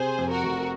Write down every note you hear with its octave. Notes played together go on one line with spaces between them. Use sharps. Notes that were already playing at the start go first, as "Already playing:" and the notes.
Already playing: C3 G#4 C5
F2
F#4 A#4
F1